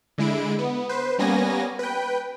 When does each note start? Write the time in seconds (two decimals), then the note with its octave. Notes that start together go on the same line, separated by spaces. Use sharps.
0.18 D3 G#3 E4 D7
0.59 B3
0.89 B4 C5
1.19 G3 A#3 B3 C#4 G#5 A#6
1.79 B4 G5